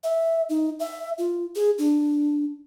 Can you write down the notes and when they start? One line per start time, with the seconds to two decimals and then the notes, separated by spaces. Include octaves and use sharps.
0.04 E5
0.49 D#4
0.80 E5
1.18 F4
1.55 G#4
1.78 D4